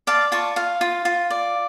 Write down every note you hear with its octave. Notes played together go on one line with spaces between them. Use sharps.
D5 F5 A5
F4 A5 C#6
F4 F5
F4
F4
D5